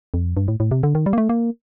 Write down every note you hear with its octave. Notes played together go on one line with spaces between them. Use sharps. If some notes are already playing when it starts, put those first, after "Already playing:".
F2
G2
A2
A2
C3
D3
D#3
G3
A#3
A3
A#3